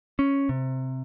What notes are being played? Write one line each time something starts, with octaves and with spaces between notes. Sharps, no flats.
C#4
C3